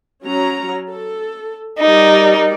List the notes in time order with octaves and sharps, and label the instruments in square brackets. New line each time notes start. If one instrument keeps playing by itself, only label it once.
[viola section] F#3 C#4 A#5
A4
[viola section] G3 A#4 D5 [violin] D#4